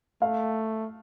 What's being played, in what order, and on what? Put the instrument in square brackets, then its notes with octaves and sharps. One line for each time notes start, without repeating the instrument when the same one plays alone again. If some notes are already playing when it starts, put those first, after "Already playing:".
[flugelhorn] A3 [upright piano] F5